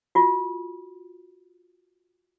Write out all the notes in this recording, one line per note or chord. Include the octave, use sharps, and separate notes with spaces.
F4 F#4